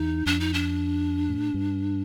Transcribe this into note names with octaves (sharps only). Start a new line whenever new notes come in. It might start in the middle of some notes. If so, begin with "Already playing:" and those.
Already playing: E2 D#4
F2 D4
D#4
D4
A2
G2